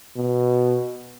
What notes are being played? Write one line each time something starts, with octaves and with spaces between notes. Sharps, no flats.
B2